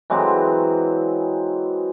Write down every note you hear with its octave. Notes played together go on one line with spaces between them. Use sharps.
E3 F#3 G#3 C4